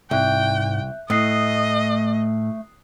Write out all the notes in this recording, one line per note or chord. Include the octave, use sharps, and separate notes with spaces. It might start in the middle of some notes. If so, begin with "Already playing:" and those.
C2 G#2 E5 G5 F#6 G6
A2 A3 D#5 D#6 F#6 C7